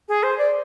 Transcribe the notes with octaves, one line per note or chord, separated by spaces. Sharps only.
G#4
C5
D5